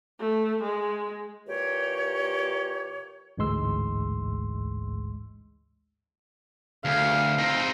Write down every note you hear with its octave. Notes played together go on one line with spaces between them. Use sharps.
A3
G#3
A#2 E3 G4 C#5
A1 D2 G#2 G#3 C6 E6
D2 F5
C4 D#4